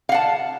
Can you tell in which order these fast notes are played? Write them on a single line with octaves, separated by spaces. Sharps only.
F5 F#5 A5